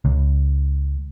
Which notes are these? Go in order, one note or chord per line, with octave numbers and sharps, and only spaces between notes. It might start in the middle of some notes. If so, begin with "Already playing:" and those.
C#2